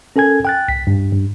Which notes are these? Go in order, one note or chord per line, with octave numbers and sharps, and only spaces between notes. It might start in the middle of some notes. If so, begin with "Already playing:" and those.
C#4 A4 A#4 G#5 G#6
G5 F#6 A6
C2 B6
G2
G2